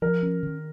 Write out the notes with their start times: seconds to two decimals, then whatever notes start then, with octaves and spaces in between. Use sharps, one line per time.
0.02 F3 A#4
0.23 C#4
0.43 D#3